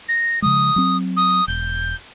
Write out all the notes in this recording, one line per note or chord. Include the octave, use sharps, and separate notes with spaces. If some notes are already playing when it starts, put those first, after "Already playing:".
A#6
C#3 F3 G#3 D#6
F#3 C4
D#6
E1 G6